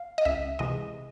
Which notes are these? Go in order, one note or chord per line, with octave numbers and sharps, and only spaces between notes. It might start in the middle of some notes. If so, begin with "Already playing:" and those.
Already playing: F5
D#5
C#2 E5
C3 E3 G#3 D#5